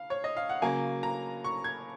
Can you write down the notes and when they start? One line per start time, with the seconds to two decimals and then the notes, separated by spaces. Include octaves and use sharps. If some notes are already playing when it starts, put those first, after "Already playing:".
Already playing: F5
0.10 C#5
0.24 D#5
0.37 F5
0.49 F#5
0.62 C#3 F#3 A#3 G#5
1.03 A#5
1.44 C#6
1.64 G#6